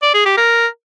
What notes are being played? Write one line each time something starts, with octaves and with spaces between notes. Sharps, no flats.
D5
G#4
G4
A#4